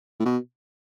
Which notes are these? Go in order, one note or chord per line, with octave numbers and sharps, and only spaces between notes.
A2
B2